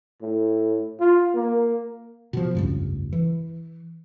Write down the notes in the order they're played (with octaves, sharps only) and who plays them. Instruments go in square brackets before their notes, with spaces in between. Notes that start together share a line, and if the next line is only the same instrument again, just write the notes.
[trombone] A2
F4
A#3
[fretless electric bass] B2 F3
F1 C#2 G2
E3